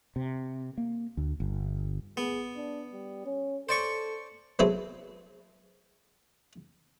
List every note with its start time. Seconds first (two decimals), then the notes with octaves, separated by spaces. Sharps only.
0.16 C3
0.78 A#3
1.17 D2
1.40 G1
2.17 B3 G#4
2.56 D4
2.92 G3
3.26 C#4
3.69 A4 C5 D5 C#6
4.59 F#3 B3 E4 G#4 A4 C5